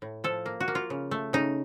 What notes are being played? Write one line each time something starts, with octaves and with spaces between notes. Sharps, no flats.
A2
F3 A4
A#3
F#4
A#3
F4
C#3
A3
C#3 D#4